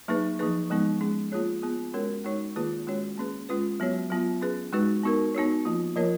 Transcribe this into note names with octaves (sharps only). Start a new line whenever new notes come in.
F#3 A#3 D#4 G#4 B4
F3 A#3 D#4 G#4 B4
F3 G#3 B3 D#4
G#3 C#4 G#4
A#3 F4 G#4 C#5
B3 F4 G#4
G#3 C#4 F#4 A#4 C#5
G#3 D#4 F#4 C#5
D#3 A#3 F4 G#4 B4
G#3 C#4 F#4 C#5
A#3 C#4 G#4 B4
G#3 C#4 F4 B4
F#3 B3 F#4 C#5
F#3 B3 F4
C#4 G#4 B4
G#3 D#4 F#4 B4
B3 D#4 F#4 A#4
B3 D#4 F#4 C#5
F3 A#3 F4
F3 A#3 F4 A#4 C#5